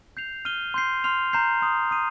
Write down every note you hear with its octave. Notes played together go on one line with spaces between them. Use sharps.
G6 C7 F7
F6 D#7 G7
C6 G6 C7
C6 F6 C7 F7
A#5 G6 C7
C6 D#6 C7
D#6 C7 D#7